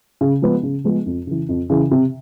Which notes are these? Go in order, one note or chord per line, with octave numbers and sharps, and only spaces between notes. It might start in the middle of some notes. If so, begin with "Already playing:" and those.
C#3
F3 G#3 B3
C#3
F3 G#3 B3
F2
C#3 E3
F2
C#3 E3
C3